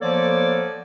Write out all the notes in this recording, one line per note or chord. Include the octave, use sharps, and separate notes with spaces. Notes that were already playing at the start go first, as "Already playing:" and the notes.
F3 A#3 B3 A4 C#5 D5